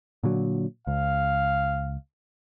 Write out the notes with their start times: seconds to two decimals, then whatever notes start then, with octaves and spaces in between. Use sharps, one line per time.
0.23 A#2 D3 F#3
0.87 C#2 F5